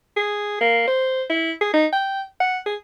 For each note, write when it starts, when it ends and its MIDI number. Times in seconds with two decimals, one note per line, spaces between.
0.16 0.59 68
0.61 0.83 58
0.87 1.24 72
1.30 1.52 64
1.61 1.73 68
1.74 1.87 63
1.93 2.22 79
2.40 2.60 78
2.66 2.76 68